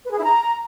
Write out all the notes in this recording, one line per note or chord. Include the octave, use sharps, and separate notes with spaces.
B4
G#4
E4
A#5